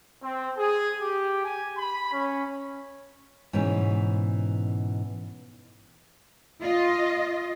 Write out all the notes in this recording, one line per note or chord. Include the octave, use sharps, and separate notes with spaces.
C4
G#4
G4
G#5
B5
C#4
G#2 B2 E3 C#4
F4 D#5